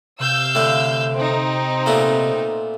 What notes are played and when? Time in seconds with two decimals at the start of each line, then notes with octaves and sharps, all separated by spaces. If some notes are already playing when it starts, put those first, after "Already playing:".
0.20 C3 F5 E6 G6
0.55 A2 D3
1.15 C4 D#4
1.86 A#2 A3 B3